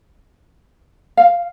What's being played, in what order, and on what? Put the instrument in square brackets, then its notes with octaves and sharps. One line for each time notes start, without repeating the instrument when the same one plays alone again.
[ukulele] F5